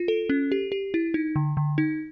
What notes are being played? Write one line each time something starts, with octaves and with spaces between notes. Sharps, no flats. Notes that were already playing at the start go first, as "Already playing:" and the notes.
Already playing: F4
A4
C#4
G4
G4
E4
D#4
D3
D3
D#4